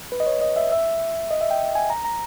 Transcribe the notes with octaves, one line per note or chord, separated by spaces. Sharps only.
B4
D#5
C#5
D#5
E5
E5
D#5
E5
G5
G#5
A#5
A#5